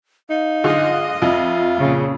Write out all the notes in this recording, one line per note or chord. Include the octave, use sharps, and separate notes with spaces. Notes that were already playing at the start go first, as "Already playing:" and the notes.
D#4 F5
D3 F4 G#4 D#5
F2 F4 E5
A#2 C#3